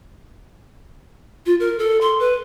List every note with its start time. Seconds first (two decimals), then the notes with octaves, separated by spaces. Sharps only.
1.46 F4
1.60 A#4
1.79 A4
2.01 C6
2.20 B4